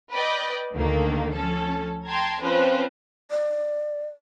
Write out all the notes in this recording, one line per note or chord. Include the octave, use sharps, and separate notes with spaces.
B4 D5 D#5 G5
D2 D3 D#3 A3 A#3
F3 C#4 A4
G5 A5 A#5 C6 G#6
F3 C4 C#4 B4 C5
D5